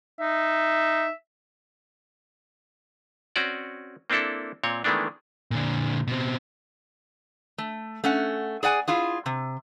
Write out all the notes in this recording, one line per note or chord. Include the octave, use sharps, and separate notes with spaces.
D#4 E5
C4 C#4 F#4 D5
A#3 C4 D4 E4 A4
A#2 C4 C#5
D#3 E3 G#3 A3 B3 D4
A#2 D3
B2 C4
A3
A3 C#4 F#5
G#4 D5 F#5 G#5
E4 F4 G#4
C3